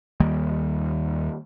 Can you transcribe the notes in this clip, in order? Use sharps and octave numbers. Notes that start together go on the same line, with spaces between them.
D#2 D#3 G3 A#3